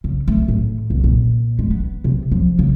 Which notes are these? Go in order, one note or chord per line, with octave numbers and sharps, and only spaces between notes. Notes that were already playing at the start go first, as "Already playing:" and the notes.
C#3
A3
A2
C2
A#2
G#3
B3
C3
F3
C#3